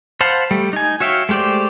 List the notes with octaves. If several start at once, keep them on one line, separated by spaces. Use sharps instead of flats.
C5 F5 F#5 A5 B5
G3 A3
D#4 G#5
F#4 C#5 E5 F5 G5
G#3 A3 G4 C5 D5